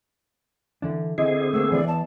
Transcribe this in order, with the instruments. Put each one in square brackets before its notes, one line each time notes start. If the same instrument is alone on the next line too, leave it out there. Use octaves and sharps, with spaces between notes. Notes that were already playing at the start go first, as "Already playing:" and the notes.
[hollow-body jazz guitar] D3 E3 D4
[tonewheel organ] D3 C4 G#4 [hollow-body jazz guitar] E4 [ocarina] D#5
[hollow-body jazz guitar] A3 A#3 [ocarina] E6
[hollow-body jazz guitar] E3 B3 [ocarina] D5
[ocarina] A5